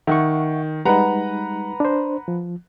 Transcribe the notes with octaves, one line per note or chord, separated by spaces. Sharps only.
D#3 E5 F#5 C#6
G3 G#3 D#4 B4 F#5 A#5
D4 C5
F3